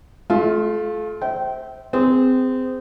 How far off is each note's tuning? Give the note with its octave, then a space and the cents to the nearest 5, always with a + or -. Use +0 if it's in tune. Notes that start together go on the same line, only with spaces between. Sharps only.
A3 -35 F4 +5
C5 +0 E5 -25 G5 -30
C4 -25 G#4 -15